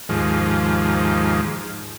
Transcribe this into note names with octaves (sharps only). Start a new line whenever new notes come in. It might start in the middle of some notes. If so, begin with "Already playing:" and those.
D#2 G#2 F3